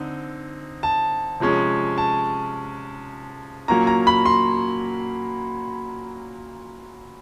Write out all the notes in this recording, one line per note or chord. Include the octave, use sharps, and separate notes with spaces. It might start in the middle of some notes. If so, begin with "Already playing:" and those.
Already playing: D3 C4 D#4
A5
C3 F3 G#3 C#4
A5
A#2 F#3 A#3 C#4 A#5
A#5
B5
C6